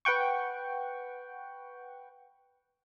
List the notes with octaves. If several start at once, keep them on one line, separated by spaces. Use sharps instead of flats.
B4 F#5 G5 C#6